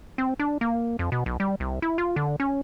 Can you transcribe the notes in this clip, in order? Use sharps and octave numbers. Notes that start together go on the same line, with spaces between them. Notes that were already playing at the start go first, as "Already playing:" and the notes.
C4
D4
A#3
F2
B2
B1
G3
C2
E4
F4
D3
C#4